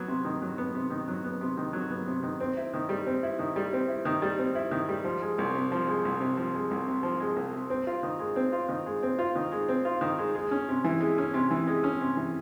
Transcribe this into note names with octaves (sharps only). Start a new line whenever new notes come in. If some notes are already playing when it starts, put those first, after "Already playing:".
Already playing: F#3 B3
C3
D#3
F#3
B3
C3
D#3
F#3
B3
C3
D#3
F#3
B3
C3
D#3
C4
E4
D#3
G3
C4
E4
D#3
G3
C4
E4
D#3
G3
C4
E4
D#3
G3
F3
G#3
C2
C3
F3
G#3
C2
C3
F3
G#3
C2
C3
F3
G#3
C2
C3
C4
F4
D#3
G#3
C4
F4
D#3
G#3
C4
F4
D#3
G#3
C4
F4
D#3
G#3
G#3
C#4
C3
E3
G#3
C#4
C3
E3
G#3
C#4
C3
E3